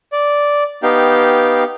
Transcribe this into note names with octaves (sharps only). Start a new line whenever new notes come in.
D5
B3 D#4 G4 F5 G5